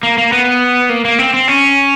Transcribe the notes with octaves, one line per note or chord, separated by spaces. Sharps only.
A#3
A#3
B3
A#3
A#3
C4
C4
C#4